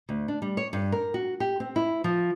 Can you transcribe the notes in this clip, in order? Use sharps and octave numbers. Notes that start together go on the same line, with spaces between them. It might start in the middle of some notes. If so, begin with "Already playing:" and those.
D2
D4
G3
C#5
G2
A#4
F#4
G4
C4
E4
F3